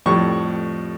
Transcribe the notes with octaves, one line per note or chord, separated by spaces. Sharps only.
F2 A2 G3 C#6